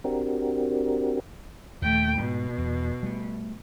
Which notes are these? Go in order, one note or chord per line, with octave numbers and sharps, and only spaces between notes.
C4 D4 F#4 G4 A#4
D#2 A#2 A3 G5
G#2 B2 B3
E2
G3 A3